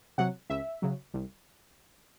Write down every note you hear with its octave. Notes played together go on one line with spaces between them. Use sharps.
C3 F#3 F#5
C#2 E5
C#3 F#3
C2